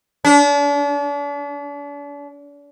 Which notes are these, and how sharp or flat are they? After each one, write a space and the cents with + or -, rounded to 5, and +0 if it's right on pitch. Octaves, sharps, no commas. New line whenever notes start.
D4 -40